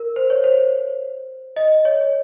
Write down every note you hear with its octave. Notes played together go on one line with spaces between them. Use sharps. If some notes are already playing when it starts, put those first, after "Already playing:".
Already playing: A#4
C5
C#5
C5
D#5
C#5